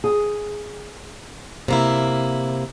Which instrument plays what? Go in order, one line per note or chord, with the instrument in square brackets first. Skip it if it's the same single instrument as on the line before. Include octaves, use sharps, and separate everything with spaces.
[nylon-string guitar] G#4
[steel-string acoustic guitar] C3 A#3 E4